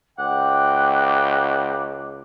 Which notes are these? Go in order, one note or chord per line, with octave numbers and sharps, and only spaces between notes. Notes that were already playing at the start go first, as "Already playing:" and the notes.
C#2 F#5 G5 D6